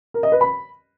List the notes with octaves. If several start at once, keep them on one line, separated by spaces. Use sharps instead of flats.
A#4
D#5
B4
B5